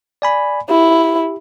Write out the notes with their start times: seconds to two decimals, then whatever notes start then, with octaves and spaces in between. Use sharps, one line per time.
0.22 D5 G#5 B5
0.69 E4 G4